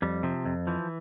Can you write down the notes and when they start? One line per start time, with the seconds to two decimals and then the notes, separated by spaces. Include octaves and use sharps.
0.02 F2 G3
0.23 C3 F3
0.45 F2
0.67 E3 F3